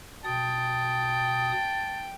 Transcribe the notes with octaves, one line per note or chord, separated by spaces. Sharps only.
B2 G5 A5 D#6